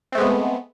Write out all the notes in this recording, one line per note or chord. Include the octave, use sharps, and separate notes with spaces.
G#3 A3 B3 C4